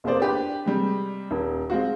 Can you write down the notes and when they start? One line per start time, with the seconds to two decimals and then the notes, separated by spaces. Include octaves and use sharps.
0.04 F1 E2 A#3 G#4 C5 D5
0.20 D4 G4 B4
0.66 C3 G3 G#3
1.31 D#1
1.70 G#3 C4 F4 F#4